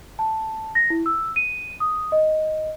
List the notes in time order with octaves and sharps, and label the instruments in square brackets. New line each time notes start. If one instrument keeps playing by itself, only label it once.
[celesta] A5
A#6
E4
E6
D#7
D#6
D#5